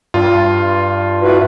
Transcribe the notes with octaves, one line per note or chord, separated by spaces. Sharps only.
G2 F4
E4 F#4 B4